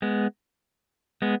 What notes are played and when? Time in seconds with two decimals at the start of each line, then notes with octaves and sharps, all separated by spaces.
0.02 G#3 B3
1.22 G#3 B3